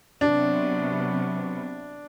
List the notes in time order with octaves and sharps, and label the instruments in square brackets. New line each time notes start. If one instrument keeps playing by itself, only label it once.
[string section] C3 F#3 B3 [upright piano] D4